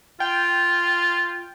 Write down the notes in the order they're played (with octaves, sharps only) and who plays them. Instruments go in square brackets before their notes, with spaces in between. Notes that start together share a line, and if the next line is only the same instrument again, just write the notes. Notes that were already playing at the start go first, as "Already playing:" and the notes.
[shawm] F4 [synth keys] G5